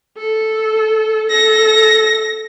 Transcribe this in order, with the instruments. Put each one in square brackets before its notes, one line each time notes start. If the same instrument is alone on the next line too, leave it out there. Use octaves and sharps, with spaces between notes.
[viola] A4
[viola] A4 [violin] A#6